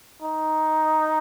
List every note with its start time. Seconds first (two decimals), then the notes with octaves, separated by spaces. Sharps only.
0.22 D#4